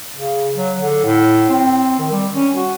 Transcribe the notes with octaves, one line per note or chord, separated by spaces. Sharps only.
C#3
F#3
D3
A2
C4
D#3
G3
C#4
F#4